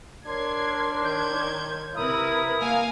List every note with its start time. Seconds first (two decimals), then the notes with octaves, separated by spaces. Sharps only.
0.26 D4 A#4 C#5 C6 G#6 C7
1.04 D#3 G6 G#6
1.96 C3 E4 A#4 B4 A#5 D#6
2.61 A#3 F5 G#5